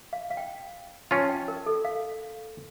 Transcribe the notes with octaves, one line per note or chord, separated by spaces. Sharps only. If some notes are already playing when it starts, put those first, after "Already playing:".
F5
F5
G5
F3 C#4 F4 A5
G5
A#4
A4
F5